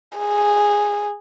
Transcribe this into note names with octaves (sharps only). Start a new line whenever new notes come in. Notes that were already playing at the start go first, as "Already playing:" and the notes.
G#4